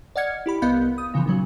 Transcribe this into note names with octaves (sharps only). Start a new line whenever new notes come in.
D5 D#5 F#5 F6 G#6 C#7
E4 G4 B5
C2 B3 D#5 F5 B5 G6
D#6
A#2 C#3 E3 F3
G#1 A#2 C#3 F#3